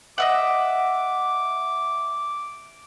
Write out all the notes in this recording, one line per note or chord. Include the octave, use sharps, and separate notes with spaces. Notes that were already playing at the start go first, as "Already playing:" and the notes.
D#5 E5 F#5 D6